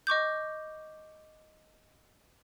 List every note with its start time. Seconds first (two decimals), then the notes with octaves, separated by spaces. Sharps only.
0.07 D#5 C#6 D6 G6